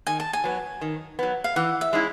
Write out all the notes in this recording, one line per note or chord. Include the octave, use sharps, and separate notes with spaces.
D#3 G#5
A5
G#5
F#3 B3
D#3
F#3 B3
F5
E3 F#5
E5
G#3 C#4 E4